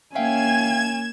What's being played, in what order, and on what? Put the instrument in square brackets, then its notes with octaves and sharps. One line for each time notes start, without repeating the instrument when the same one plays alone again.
[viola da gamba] A#3 [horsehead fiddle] C#4 G#5 [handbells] E5 F5 G5 [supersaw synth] G#6 E7